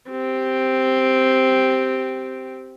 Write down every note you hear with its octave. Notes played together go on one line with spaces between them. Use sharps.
C4 G4